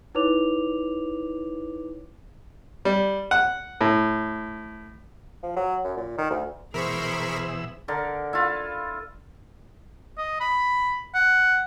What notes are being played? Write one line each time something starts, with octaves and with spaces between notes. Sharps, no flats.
D#4 E4 B4 C#5 D6 F7
G3
F#5
A2
F3
F#3
F#2
A#2
D#3
D2
B2 E3 G#4 A#4 C5 B5 C#6 E6
D3 A#4
E4 F4
D#5
B5
F#5